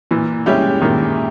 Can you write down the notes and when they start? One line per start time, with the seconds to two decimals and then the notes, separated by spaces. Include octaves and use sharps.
0.11 A#2 E3
0.46 G3 G#3 C#4 E4 G4
0.81 A#2 D#3